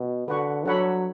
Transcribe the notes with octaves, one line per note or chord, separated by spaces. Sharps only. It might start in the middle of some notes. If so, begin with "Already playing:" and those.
Already playing: B2
D3 F#4 B4 F#5 C#6
F#3 D4 A4 C#5 F#5 B5